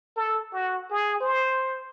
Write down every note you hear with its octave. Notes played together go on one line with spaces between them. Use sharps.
A4
F#4
G#4
C5